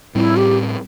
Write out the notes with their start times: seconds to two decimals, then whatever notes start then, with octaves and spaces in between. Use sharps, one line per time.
0.15 A2 G3 C4 E4
0.36 G4